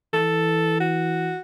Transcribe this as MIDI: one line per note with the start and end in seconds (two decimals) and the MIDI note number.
0.13 1.33 52
0.13 0.76 69
0.80 1.40 66